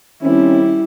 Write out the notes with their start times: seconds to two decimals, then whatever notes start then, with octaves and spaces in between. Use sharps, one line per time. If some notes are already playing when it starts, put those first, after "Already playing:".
0.23 D#3 G3 C4 C#4 E4